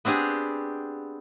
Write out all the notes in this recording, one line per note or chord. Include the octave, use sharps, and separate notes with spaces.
B3 C4 D4 G4 G#4